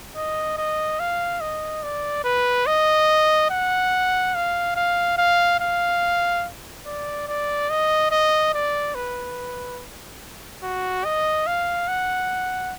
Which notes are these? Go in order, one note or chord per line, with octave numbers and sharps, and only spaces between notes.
D#5
D#5
F5
D#5
D5
B4
D#5
F#5
F5
F5
F5
F5
D5
D5
D#5
D#5
D5
B4
F#4
D#5
F5
F#5